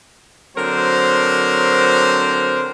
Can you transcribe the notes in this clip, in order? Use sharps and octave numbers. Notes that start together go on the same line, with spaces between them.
D3 F#3 C4 A#4 C5